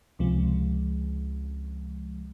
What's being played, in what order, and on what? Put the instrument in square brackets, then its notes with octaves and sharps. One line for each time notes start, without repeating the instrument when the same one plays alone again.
[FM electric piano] C#2 C3 F3 G#3